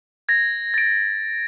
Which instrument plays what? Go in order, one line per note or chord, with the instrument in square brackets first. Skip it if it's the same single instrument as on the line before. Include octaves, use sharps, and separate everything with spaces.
[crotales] G#6 A#6
A6 D7